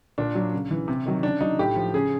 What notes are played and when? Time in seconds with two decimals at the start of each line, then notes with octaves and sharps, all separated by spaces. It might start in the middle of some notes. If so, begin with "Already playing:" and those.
0.18 A#2 D4
0.35 F#3
0.53 C#3
0.71 E3
0.88 C3
1.06 D#3 F#3
1.23 C#3 D4
1.41 F#3 D#4
1.59 A2 G4
1.76 F3
1.94 C#3 G#4